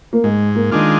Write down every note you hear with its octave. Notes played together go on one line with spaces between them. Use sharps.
A#3
G#2 G#3
A#3
D#3 G#3 D4 F4